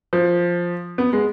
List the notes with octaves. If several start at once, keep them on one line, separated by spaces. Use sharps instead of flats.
F3
B3
G#3